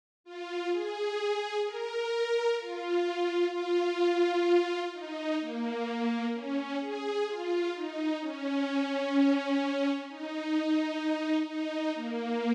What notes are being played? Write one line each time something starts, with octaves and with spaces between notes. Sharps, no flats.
F4
G#4
A#4
F4
F4
D#4
A#3
C#4
G#4
F4
D#4
C#4
D#4
D#4
A#3